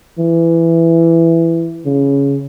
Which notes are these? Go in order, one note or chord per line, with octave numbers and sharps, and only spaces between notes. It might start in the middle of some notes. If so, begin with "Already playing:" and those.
E3
C#3